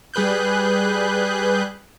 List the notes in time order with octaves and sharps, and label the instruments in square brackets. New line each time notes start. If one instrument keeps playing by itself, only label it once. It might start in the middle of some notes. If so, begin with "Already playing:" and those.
[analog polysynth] G3 G#4 B4 F#6 G6